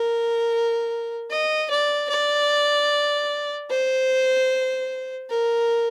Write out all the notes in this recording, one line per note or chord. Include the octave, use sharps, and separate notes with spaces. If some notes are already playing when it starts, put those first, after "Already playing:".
Already playing: A#4
D#5
D5
D5
C5
A#4